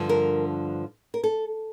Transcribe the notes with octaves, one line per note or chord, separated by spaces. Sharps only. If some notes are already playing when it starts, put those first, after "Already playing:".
Already playing: G2 D3 F3
A#4
A#4
A4